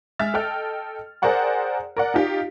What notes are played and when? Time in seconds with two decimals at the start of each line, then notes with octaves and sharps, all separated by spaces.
0.19 G#3 E5 F6 A6
0.34 A4 D#5 G5 F6
1.22 G#4 A#4 C5 D5 F#5 G5
1.97 A#4 D5 F#5
2.14 D#4 F4 G4 F5